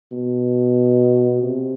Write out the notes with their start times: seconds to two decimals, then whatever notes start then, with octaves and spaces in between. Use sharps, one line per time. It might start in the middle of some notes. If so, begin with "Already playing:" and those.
0.12 B2
1.43 C3